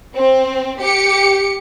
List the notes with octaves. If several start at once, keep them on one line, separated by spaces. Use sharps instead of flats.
C4
G4 C#7